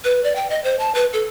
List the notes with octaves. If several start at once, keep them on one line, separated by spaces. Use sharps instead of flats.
B4
D5
G5
D#5
C5
A5
B4
A4